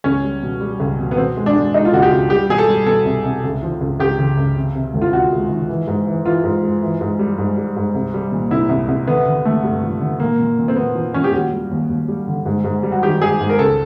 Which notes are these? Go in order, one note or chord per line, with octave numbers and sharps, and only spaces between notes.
C#2 C#4
G3
B2
G3
C#2
B2
B3
B2 C4
G#3
D4
G#3
G#3 D#4
F4
C#2 F#4
G4
C#2
G3 G4
B2 G#4
A4
G3
B2 A4
C2
C2
C#2
F3
C#2
C#2 G4
C#3
C#2
C3
C3
D2
F4
C3 F#4
G#3
D#3
E3
G#2
E3
E3 F4
G#2
G#3
E3
G#2
G3
G#2
G3
G#2
C2
G3
A#2
C2 E4
C2
C2
D3 B3
D3
A3
G2
F3
D3
A#2 A#3
A#2
A#2
C4
A#2 B3
F3
F3 C#4
G4
D#2 F#4
G3
D#2
D#2
G3
D3
G#2
G#2
G3
F#4
D#3 G4
G#2 G#4
G#2
A#4
C#2 A4